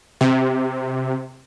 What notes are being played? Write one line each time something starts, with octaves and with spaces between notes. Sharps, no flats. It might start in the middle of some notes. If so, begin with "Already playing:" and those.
C3